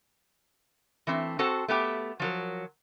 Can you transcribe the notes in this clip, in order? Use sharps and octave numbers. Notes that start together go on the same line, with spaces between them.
E3 A3 C4
C4 F#4 A4 C5 F#5 A5
A3 B3 G4 G5
F3 F#3 A#4